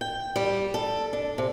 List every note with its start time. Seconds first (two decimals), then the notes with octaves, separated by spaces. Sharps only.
0.01 G5
0.36 G3
0.74 A4
1.13 D4
1.38 C3